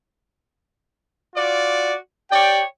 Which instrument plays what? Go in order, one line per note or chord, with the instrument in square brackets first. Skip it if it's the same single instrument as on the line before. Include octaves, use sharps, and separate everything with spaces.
[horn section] F4 F#4 D5
[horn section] G4 C#5 D5 [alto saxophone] G5